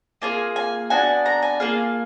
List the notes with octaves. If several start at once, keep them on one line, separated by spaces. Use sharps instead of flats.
A#3 F4 G#4 G#5
G#5
B3 D4 F#4 G#5
A#5
G#5
A#3 F4 G#4 F5